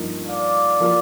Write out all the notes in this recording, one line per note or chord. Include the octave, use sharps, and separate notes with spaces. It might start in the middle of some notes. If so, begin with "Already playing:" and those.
Already playing: G2 F3 A#3 D#4
D5 F5
F3 A#3 F4